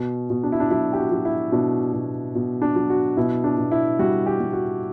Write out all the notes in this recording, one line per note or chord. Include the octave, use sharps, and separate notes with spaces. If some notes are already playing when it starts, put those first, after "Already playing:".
Already playing: B2
B2
D4
E4
D4
F#3 E4
G4
F#4
F#3
E4
B2 D4
B2
B2
D4
F#3
F#4
B2 E4
D4
B2
E4
G3 F#4
G4
G3
F#4